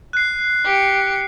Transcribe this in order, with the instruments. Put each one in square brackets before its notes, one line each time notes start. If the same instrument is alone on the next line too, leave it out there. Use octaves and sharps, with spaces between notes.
[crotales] F#6 C7
[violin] G4 C#7